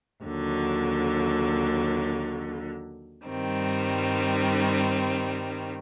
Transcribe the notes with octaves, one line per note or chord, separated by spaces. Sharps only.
D#2 D3 F#3
G2 D#3 G3 C4